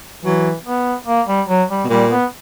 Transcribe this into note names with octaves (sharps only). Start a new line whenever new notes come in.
E3 F#3
B3
A#3
G3
F#3
G3
B2
A#2 G3
B3